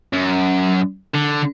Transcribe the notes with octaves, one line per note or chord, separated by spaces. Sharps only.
F#2
D3